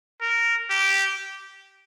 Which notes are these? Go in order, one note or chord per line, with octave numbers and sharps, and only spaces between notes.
A#4
G4